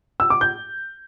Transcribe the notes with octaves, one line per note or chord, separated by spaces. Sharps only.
E6
D6
G6